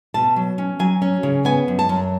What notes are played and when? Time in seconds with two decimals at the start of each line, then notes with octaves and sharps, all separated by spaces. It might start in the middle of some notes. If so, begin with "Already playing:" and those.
0.14 B2 A5
0.36 F#3
0.58 C#4
0.79 F#3 G#5
1.02 C#4
1.23 C#3
1.45 B3 G#5
1.68 F#2
1.79 A5
1.89 F#2